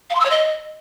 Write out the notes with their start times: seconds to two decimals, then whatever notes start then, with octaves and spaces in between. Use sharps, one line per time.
0.10 F5
0.15 C6
0.20 E6
0.25 C#5
0.30 D#5